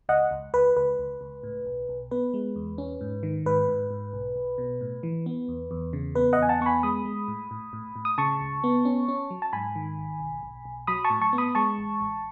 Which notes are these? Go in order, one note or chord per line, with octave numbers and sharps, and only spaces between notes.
C#2 D#5 F#5
C#2
C#2 B4
C#2 B4
C#2
C#2
A2
B1
B1
B3 B4
G#3
E2
C#4
G#2
D#3
G#2 B4
G#2
G#2
B1
B1
B2
A2
E3
B3
E2
E2
C#3
B3 B4
D#5 F#5
E2 G#5
F#5 A5
B3 C#6
G#5 B5
G#3 B5 D#6
G#3
A2
A2
A2
A2
D#6
C#3 A5 C#6
C#2
B3
C#4
C#4
F#3
A5
G#2 G#5 B5
D#3
G#1
B1
B1
B1
F#3 B5 D#6
A5 C#6
A2
A5 C#6
B3
B5 D#6
G#3 A5 C#6
A1
A1